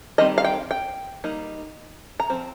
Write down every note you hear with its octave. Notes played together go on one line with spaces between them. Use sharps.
D#3 G3 C4 D#5
F5
G5
G5
G3 A#3 D#4
A#5
F3 C4